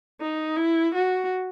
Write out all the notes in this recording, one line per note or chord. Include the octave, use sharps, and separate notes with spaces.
D#4
E4
F#4